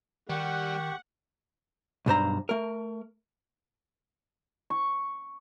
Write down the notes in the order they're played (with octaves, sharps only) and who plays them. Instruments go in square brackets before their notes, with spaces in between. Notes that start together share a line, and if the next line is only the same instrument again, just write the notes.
[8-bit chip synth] D#3 [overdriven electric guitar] G3 [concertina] G4 C#6 [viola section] F#5
[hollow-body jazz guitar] B1 G2 C5 A#5
A3 A#4
[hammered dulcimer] C#6